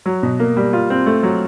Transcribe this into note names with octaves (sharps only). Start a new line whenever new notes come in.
F#3
B2
A#3
G3
F4
C4
A3
F#3